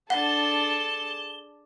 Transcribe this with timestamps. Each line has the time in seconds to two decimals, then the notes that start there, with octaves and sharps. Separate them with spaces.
0.10 D4 G#4 A4 F#5 A5 G7